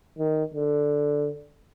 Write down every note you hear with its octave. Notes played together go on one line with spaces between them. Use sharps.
D#3
D3